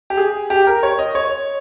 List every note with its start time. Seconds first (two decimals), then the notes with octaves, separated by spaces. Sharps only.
0.10 G4
0.17 G#4
0.50 G4
0.67 A#4
0.83 C#5
0.99 D#5
1.15 C#5